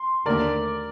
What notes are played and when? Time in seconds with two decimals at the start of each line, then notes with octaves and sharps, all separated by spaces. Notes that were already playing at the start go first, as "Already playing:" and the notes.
Already playing: C6
0.26 D#2 D3 A3 A#4 D5